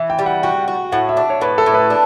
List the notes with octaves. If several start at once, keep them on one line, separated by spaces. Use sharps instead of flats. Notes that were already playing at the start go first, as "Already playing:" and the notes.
Already playing: E3
G5
G3
F#5
F#4 G5
F#4
A2 F#5
E5
D4
C#5
A2 B4
A4
A2
B4
D4